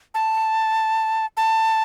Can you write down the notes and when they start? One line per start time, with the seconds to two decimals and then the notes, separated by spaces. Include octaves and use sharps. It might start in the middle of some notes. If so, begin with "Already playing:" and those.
0.14 A5
1.37 A5